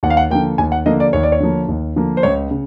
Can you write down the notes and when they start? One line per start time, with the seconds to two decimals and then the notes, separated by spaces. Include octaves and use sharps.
0.03 D#2 F#5
0.10 F5
0.17 F#5
0.30 D3 F3 A#3 G5
0.58 D#2 G#5
0.72 F#5
0.86 D3 F3 A#3 D#5
1.00 D5
1.13 D#2 C#5
1.23 D5
1.32 C#5
1.40 D3 F3 A#3
1.68 D#2
1.96 D3 F3 A#3
2.17 C5
2.23 C#2 C#5
2.51 C#3